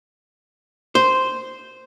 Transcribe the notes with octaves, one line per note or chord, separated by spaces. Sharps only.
C5